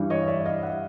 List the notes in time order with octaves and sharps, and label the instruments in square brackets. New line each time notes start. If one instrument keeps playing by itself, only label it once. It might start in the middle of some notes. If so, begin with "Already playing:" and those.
Already playing: [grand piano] G2 E3 G3
C#5 D#5
D5 E5
D#5 F5
E5 F#5